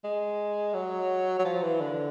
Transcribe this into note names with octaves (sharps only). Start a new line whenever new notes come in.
G#3
F#3
F#3
F3
E3
D3